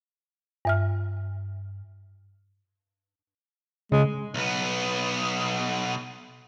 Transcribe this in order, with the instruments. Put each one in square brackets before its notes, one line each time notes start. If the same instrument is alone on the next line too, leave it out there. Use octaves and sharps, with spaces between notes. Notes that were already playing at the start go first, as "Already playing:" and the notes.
[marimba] G2 E5 F6
[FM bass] C#3 [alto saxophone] G#3
[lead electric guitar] B1 B3